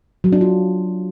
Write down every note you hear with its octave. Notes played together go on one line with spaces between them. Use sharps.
F#3
D4
F4